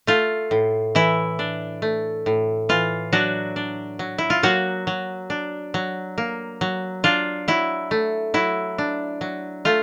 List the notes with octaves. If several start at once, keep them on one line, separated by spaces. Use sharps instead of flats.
A3 F4
A2
E3 E4
D4
A3
A2
E3 F4
F#3 D4 F#4
D4
F#3
E4
F4
F#3 A#3 F#4
F#3
D4
F#3
A#3
F#3
D4 F4
F#3 E4
A3
F#3 E4
D4
F#3
A3 F4